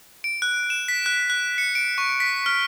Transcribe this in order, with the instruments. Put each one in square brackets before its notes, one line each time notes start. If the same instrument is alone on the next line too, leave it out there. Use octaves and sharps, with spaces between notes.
[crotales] D7
F#6
E7
B6
F#6
F#6
C#7
D7
C#6
B6
F6